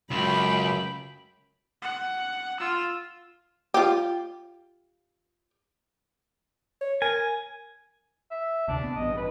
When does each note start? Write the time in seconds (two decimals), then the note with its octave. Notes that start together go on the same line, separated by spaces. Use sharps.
0.11 C#2 F#2 G5 B5
1.82 F#5
2.60 F4 E6
3.74 F4 G4
6.81 C#5
7.02 A#4 G#5
8.31 E5
8.68 D2 C3 D4
8.84 B3
8.96 A1 G2 D#5
9.17 B4